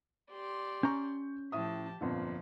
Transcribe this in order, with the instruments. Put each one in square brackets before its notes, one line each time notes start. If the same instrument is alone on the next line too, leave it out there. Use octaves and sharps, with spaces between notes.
[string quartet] G4 D5 C6
[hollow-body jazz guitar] C#4 A#5 [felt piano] C#6 G6
[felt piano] A2 E5 D#6 [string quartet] F3 G4 A5
[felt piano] G1 F2 A#2 [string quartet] F3